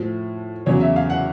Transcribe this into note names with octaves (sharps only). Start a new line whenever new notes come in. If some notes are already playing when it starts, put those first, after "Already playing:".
Already playing: A2 F3
E2 C#3 F#3 C#5
E5
F5
F#5